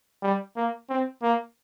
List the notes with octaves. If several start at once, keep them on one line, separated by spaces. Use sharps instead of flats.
G3
A#3
C4
A#3